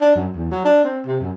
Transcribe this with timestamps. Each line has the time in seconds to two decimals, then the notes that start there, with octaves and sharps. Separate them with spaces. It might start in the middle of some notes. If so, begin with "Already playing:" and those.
0.01 D4
0.16 F#2
0.35 E2
0.51 F#3
0.65 D4
0.84 C4
1.06 C3
1.21 F#2